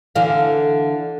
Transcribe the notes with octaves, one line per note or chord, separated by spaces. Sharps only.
D3 E3 F5